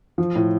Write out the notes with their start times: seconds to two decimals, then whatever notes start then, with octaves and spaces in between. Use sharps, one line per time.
0.18 F3
0.35 A2